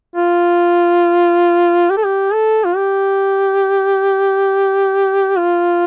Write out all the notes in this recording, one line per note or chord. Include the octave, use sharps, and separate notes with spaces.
F4
G4
A4
G4
A4
F4
G4
F4